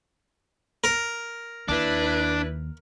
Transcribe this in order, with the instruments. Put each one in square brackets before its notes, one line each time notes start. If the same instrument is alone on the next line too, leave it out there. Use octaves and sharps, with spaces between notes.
[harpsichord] A#4
[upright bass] D#2 [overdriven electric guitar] D4 [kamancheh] E4 B4